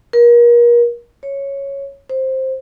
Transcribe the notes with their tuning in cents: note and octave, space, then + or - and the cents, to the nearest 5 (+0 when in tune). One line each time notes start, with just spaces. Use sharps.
A#4 +35
C#5 -5
C5 +10